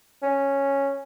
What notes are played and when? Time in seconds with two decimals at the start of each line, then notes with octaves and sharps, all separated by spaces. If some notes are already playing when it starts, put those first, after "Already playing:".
0.22 C#4